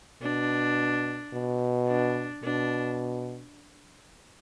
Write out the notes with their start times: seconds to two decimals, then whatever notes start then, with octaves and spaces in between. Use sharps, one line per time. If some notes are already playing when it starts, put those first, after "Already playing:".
0.22 B2 D4
1.33 B2
1.89 D4
2.44 B2 D4